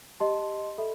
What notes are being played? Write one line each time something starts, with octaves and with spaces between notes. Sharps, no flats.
G4 D#5 A5 C6
A4 E5 B5